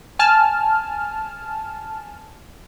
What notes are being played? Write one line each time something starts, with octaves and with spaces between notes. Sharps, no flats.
G#5 A5 F6